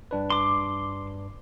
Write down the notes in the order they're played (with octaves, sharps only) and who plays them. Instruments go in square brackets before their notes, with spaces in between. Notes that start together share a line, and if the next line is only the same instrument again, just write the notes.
[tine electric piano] G2 D4 B4
[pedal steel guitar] C6 D6